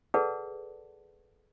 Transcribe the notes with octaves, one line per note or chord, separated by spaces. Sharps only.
G#4 A4 B4 D5 F#5 A5